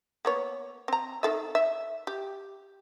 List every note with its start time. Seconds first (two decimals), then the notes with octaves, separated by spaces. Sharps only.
0.25 A#3 B3 C#5
0.88 C4 A#5
1.23 D#3 A4 E5
1.55 E5
2.07 G4